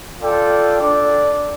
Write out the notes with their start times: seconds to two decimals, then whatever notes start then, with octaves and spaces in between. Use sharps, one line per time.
0.19 F4 A4 D5 G5
0.80 D4 A4 D5